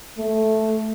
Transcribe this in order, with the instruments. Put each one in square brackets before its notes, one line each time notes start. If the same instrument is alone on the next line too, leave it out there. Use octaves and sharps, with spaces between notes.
[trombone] A3